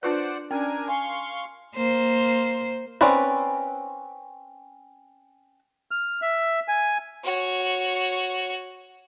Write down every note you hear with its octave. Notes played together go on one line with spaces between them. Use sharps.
D4 F4 B4 C5 D5 F#5
C#4 D4 A#4 G#5
F5 G#5 C6 C#6
A#3 C5
C4 C#4 B4 D5
F6
E5
G#5
F#4 C#5